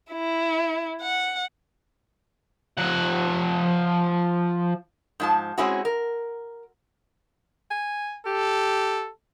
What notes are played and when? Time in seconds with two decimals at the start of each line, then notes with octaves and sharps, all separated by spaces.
0.12 E4
1.02 F#5
2.77 F3 F#5
5.20 G#2 F3 A5
5.58 G#3 C4 C#4 E4 F#4
5.85 A#4
7.71 G#5
8.26 G4 A4